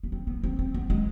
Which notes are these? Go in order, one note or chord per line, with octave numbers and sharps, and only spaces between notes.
B3
C4
B3
C4
C4
B3
G#3